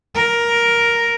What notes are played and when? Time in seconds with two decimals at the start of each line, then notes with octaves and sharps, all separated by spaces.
0.15 A#4